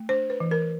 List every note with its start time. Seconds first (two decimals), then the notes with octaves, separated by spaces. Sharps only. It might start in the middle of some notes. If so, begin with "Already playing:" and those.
Already playing: A3
0.09 D4 C5
0.30 B4
0.40 E3
0.51 A#4